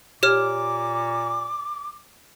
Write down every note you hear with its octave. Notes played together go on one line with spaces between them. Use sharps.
A#2 G4 C#5 D6 F6